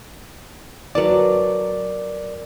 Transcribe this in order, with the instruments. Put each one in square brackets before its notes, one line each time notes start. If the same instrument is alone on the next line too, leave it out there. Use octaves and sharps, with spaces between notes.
[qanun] F#3 B4 A5 [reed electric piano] A#4 D5